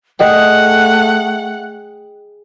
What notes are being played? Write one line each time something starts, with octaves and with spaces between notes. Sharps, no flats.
A3 G#4 D#5 F#5 G5